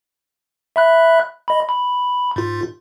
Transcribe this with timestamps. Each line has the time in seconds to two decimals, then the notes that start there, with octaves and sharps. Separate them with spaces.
0.76 E5 B5 F#6
1.48 D#5 B5
1.69 B5
2.36 G#2 F4